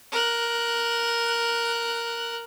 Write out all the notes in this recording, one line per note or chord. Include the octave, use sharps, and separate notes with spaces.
A#4 F#6